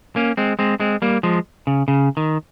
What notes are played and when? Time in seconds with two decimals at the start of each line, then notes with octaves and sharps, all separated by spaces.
0.16 A#3 C#4
0.37 G#3 C4
0.59 G#3 C4
0.80 G#3 C4
1.02 G3 A#3
1.23 F3 G#3
1.67 C#3
1.88 C#3
2.17 D#3